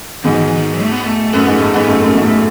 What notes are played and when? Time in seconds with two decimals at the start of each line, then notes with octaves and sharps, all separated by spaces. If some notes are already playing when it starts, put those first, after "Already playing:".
0.24 G#2 B2 D#3
0.32 E3
0.40 D#3
0.47 E3
0.55 D#3
0.79 A3
0.91 B3
1.05 A3
1.33 F#2 A2 B3
1.47 G#2
1.60 G#2 A3
1.74 G#2 B3
1.88 F#2 A2 A3
2.02 F#2 A2
2.14 G#2 B2
2.22 A2